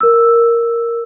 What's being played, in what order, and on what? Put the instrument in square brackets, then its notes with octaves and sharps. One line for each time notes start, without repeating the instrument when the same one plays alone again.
[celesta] A#4 E6